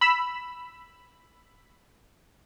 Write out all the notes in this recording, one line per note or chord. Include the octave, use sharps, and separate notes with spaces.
B5 E6